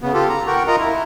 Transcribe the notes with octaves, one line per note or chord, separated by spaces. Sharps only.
C#3 B3
F4 G4 A4
A#5
A#4 F#5 G5 C#6
F4 A#4 D#5 A#5
E4